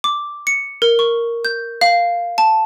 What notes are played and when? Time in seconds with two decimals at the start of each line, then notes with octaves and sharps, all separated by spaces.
0.04 D6
0.47 C#7
0.82 A#4
0.99 C#6
1.45 G6
1.81 F5
2.38 A5